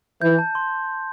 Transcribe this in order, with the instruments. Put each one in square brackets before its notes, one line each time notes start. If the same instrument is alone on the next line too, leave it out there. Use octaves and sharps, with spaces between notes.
[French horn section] E3 [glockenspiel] G6
[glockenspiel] A5
C6